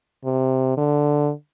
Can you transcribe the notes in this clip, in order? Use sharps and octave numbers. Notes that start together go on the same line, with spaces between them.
C3
D3